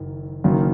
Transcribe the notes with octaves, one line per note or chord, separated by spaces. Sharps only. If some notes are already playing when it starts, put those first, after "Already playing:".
Already playing: F#1 F#2 D#3
F#1 F#2 D#3 F#3 A#3